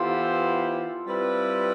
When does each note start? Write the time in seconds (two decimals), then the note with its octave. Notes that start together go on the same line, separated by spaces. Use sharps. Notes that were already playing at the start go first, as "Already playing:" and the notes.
Already playing: E3 B3 E4 F4 G4 A4 C5
1.07 G3 C4 E4 B4